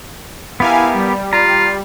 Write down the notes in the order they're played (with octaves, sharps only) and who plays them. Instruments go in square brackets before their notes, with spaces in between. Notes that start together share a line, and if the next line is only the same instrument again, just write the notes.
[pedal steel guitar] B3 G4 A#4 [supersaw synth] E4 F5 G#5
[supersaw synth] G3
[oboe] F4 [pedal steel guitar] A#5